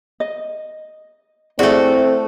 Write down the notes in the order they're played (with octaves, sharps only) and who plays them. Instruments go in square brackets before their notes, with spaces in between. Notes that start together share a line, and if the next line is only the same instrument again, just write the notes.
[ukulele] D#5
[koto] A3 F#4 [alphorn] C4 [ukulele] E4 G#4 D5